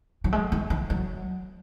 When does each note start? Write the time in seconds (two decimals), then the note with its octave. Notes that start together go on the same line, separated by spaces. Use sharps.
0.24 F#3
0.33 G#3
0.52 F#3
0.70 F3
0.90 F#3